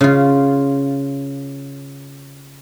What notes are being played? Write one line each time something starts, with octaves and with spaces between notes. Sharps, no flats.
C#3 F4